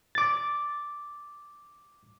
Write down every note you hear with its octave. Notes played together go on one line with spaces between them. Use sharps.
D6 A6